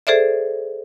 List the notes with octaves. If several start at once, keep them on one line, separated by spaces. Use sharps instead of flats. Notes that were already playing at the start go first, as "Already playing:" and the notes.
G#4 A4 C5 D5 E5